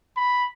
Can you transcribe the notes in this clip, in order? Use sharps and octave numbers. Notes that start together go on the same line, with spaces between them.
B5